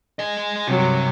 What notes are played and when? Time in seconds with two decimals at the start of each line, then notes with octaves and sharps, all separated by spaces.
0.19 G#4 D#5
0.67 G2 C3 D#3 F#3